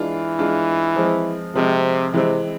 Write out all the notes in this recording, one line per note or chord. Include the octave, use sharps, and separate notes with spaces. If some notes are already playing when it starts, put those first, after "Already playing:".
Already playing: E3 G#3 D4 F4
G#3 D4 F4
F3 G#3 C4
C3 F3 G#3 C4
C3 E3 G#3 C4